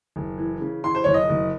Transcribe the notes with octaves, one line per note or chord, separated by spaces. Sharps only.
F#1
E3
C#3
E3 C6
C5
F#1 C#5
D#5
F#1